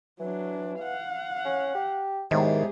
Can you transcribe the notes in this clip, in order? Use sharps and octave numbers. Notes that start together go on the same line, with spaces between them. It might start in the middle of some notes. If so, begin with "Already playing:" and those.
E3 F#3 D4
F5 F#5
C#4
G4
B1 G#2 D#3 E4 G4 G#4